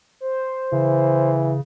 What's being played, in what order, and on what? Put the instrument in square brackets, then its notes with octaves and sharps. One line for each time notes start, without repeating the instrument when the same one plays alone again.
[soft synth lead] C5
[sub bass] C#3 [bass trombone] E3